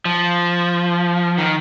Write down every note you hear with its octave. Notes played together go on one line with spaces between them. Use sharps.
F3
D#3